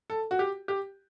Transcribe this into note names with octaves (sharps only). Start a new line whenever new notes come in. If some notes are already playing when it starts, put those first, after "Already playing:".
A4
F#4
G4
G4